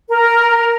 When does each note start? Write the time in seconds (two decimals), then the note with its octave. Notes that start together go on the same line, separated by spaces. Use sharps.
0.08 A#4